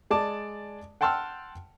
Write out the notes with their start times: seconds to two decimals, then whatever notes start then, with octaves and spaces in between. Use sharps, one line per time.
0.10 G#3 D5 A5 D6
1.01 F#5 G5 A5 C6 E6 F6